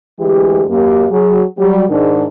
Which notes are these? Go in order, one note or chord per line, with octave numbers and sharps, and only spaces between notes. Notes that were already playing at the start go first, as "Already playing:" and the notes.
D2 E3 G#3 G4
F#2 A#3 G4
F#3 G#4
F#3 G3
G#2 D#3 D4